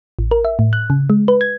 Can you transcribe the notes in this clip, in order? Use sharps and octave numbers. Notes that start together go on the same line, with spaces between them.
A1
A#4
E5
A2
F#6
C#3
G#3
B4
G#6